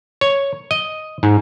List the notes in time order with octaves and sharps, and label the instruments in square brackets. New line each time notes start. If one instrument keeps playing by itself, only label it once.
[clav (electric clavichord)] C#5
D#5
G#2